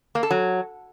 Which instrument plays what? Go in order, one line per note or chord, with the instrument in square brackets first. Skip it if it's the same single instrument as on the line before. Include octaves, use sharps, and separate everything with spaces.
[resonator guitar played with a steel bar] A#3
A4
F#3